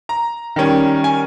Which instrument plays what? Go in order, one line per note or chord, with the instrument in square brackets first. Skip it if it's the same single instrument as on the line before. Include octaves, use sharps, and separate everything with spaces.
[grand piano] A#5
D#3 G3 C#4
G#5